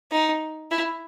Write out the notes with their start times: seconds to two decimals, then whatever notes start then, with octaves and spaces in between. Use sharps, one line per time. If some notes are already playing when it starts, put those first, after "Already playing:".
0.12 D#4
0.71 E4